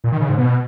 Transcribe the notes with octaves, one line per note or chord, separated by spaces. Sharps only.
A#2
D#3
C#3
G#2
B2